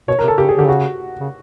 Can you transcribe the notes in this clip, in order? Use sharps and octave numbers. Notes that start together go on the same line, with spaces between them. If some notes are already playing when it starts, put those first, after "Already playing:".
B2 C#5
A#4
C3
A4
C#3 G4
G#4
D3 G4
C#3 F#4
C#3